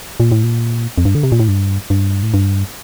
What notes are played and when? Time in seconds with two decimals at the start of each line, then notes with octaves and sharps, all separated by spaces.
0.20 A#2
0.32 A2
0.43 A#2
0.98 F2
1.05 G2
1.15 D3
1.23 C3
1.32 A#2
1.40 A2
1.48 G2
1.90 G2
2.23 A2
2.34 G2